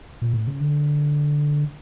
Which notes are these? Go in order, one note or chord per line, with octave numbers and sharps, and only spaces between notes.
A#2
A2
C#3
D3